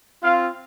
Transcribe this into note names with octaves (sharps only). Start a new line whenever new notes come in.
C4 F4 F5